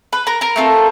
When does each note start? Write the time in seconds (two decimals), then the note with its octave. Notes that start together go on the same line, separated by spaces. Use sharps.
0.13 B4 B5
0.27 A#4 A#5
0.41 A#4 A#5
0.56 A3 C4 F4 A4